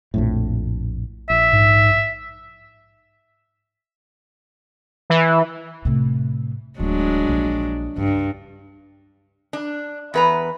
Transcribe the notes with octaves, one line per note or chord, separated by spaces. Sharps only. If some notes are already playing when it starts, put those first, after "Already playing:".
A#1 F2 A2
A#1 E5
G#2
E3
A2 C3
D1 F#3 G#3 D4
A#1
C#2 G2
D4
E2 B4 A#5